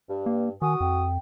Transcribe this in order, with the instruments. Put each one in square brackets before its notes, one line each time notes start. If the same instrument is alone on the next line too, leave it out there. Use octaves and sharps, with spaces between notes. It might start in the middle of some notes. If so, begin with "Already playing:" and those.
[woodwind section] G2
[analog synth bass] A#3
[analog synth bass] D#3 [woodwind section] F#4 D#6 [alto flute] G#5
[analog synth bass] F2 [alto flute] G5